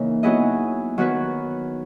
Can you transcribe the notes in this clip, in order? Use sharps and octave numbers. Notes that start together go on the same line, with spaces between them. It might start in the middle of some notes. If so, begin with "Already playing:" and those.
Already playing: C#3 E3 A#3 D#4
F#3 B3 E4 G#4 D#5
D#3 F#3 B3 F#4 B4